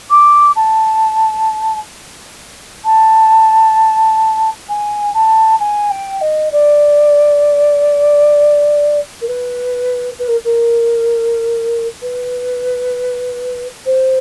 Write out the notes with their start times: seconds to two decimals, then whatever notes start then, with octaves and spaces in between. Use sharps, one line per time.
0.10 D6
0.55 A5
2.84 A5
4.68 G#5
5.14 A5
5.59 G#5
5.90 G5
6.21 D#5
6.52 D5
9.20 A#4
9.27 B4
10.18 B4
10.27 A#4
10.44 A#4
12.01 B4
13.85 C5